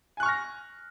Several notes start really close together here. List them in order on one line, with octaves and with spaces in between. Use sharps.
G#5 F#6 C#6 F6 A#6